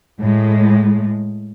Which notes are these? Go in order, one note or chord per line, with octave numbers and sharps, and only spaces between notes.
A2 G#3